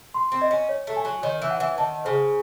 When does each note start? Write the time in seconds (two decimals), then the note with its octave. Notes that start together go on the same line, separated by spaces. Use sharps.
0.14 C6
0.32 C4
0.41 D#5
0.51 C#4
0.69 C#5
0.87 A3
0.96 G#5
1.05 F#3
1.23 D#3 C#5
1.42 E3
1.51 F#5
1.60 E3
1.78 D#3 A5
2.05 C#3 C5